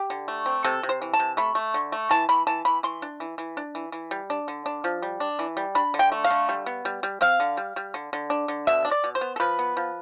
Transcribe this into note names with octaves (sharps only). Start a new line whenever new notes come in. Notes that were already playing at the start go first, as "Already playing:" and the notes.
Already playing: G4
D3
A3
C4
C3 A4
C3
C5
E3
A5
C3
A3 B5
A3
D3
A3
E3 A5
E3 B5
E3 A5
E3 B5
E3 C6
D4
E3
E3
D4
E3
E3
G3
D4
D3
D4
F3
G3
D4
E3
G3
D4 B5
D3
G5
A3
F5
D3
G3
B3
G3
G3
C4 F5
D3
G3
G3
D3
D3
D4
D3
B2 E5
D4
D5
B2
C5
B3
A4
F3 B4
B3
F3